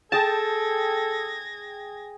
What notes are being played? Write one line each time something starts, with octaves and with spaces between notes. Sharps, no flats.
G#4 A4 G5 A5 G#6 A#6